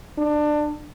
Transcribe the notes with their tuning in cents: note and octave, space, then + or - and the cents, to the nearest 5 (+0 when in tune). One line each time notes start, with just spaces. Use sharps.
D4 +20